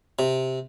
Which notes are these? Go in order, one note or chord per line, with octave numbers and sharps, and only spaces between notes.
C3